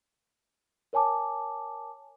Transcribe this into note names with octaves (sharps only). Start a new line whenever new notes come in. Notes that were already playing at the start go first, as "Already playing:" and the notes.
A#4 C#5 G#5 A5 D6